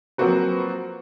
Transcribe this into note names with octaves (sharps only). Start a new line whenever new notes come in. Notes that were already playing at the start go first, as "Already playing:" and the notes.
F3 F#3 A#3 C4 F#4 B4